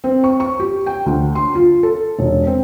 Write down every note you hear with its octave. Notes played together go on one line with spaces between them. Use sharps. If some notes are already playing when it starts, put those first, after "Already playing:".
C4
C#6
C#6
G4
G5
D2
C6
F4
A4
E1
C4